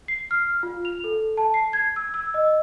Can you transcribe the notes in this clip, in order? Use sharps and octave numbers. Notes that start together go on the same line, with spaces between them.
C7
F6
F4
F7
A4
A5
C7
G#6
E6
E6
D#5